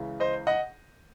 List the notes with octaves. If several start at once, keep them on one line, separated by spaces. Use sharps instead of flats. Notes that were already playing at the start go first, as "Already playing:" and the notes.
Already playing: C#2 C#3 E3
C5 D#5
D#5 F#5